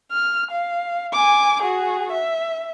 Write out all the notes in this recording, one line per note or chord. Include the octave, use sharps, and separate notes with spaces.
F6
F5
G#5 D6
F#4 G#4
E5